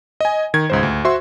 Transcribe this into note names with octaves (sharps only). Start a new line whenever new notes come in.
D#5 G#5
D#3 G#6
C#2 G#2 C5
D2
F#4 C5 E5 C6